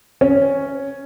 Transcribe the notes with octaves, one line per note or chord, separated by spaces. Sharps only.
C#4